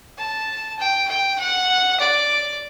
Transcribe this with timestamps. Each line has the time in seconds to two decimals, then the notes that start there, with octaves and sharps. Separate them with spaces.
0.18 A5
0.79 G5
1.09 G5
1.39 F#5
2.00 D5